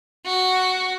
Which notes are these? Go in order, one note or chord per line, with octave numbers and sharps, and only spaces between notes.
F#4